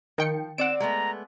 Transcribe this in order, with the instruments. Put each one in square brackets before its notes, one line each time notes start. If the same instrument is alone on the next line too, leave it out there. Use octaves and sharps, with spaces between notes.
[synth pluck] D#3 G5 C#7 [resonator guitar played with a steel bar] F3
[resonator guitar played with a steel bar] C4 D5 [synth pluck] F#5 D7 [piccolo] E7
[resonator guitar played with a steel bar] G#3 A3 B3 [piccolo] A#5